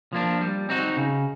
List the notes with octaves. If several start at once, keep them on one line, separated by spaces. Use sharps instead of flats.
F3 A#3 D4
G3
C4 D#4 F#4
C#3